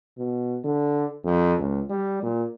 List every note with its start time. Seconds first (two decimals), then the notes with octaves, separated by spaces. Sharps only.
0.18 B2
0.64 D3
1.25 F2
1.59 C#2
1.90 G3
2.23 A#2